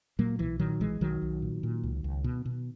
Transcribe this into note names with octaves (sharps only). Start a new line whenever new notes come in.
A#2 F#3 A#3
B1 E3
A#2 D#3 F#3
B1 E3 G#3
B1 D#3 F#3
B1
A#2
A#2
C#2
C#2
B2
B2